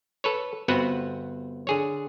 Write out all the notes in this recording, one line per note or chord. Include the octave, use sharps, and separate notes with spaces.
A4 B4 C#5
G1 B3 C4 F#4 B4 F#5
D3 G#4 C#5